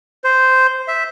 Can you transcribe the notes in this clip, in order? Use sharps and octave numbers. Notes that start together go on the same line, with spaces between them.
C5
E5